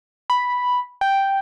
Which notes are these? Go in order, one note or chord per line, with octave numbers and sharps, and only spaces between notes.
B5
G5